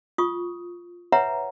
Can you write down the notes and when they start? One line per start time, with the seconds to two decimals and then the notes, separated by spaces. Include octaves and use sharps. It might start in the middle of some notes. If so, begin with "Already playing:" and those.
0.18 F4 C#6 D#6
1.12 B4 C#5 E5 F#5 A#5